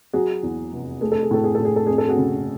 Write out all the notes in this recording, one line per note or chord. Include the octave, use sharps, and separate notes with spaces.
F#3 F#4 G#4
E2
F1
A3 G#4
A4
G#4
A2 A4
G#4
A2 A4
G#4
A4
F2 G#4
A4
F#4 G#4
C#3